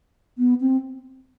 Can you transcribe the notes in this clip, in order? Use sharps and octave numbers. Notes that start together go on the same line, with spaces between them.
B3
C4